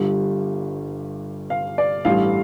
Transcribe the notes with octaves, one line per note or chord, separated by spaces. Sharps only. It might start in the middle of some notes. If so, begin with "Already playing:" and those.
Already playing: G1 G2 G3
F5
D5
A1 G2 G3 F5